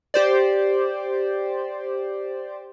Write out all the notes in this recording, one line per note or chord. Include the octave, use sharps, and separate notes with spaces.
G4 C5 D5